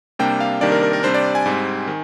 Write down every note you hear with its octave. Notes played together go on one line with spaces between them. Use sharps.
C3 G3 A#3 D4 G5
F5
C3 D#3 G3 A#3 D4 D5
A#4
A#4
A#4
C3 G3 D4 C5
D5
G#5
G#2 G3 C4
D#3